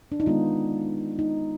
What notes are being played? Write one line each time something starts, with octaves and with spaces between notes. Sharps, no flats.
D4
D#4
D#3 G#3 B3 F4
D#4